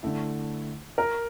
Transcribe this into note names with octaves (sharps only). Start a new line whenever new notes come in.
D3 A3 E4
A#4